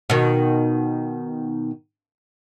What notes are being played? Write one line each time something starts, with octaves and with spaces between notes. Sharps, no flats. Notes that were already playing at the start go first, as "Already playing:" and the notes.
B2 D#3